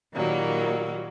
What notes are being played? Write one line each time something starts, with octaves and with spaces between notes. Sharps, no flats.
A#2 D#3 F#3 G3 A#3